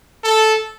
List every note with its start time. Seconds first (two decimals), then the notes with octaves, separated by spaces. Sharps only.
0.24 A4